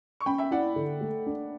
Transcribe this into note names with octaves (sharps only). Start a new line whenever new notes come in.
C#6
C#4 G5 B5
E5 G5
E4 D5 F#5
D3
A3
D4